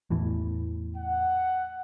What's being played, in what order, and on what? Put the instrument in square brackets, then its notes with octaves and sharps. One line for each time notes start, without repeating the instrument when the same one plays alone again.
[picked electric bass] E2 A2 E3
[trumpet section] F#5